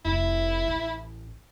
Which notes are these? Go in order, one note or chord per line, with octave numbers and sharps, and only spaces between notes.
F1 E4
A1